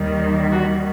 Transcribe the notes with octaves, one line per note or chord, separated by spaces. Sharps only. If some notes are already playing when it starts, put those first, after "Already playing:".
Already playing: D#2 D#3 G3
F#4